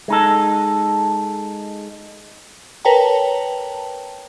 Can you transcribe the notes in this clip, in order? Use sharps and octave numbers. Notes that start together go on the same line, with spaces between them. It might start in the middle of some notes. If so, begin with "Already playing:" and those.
G#3 D#4 A4
A#4 B4 C#5 G5 A5 A#5